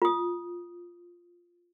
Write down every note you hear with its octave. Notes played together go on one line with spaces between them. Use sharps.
F4 D#6